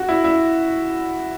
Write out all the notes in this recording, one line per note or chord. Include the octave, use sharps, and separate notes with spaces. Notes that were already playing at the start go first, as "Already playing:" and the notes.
Already playing: F#4
E4
E4